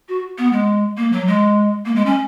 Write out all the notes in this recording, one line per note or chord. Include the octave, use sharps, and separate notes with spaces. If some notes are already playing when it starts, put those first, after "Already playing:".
F#4
B3
G#3
A#3
F#3
G#3
A#3
G#3
C#4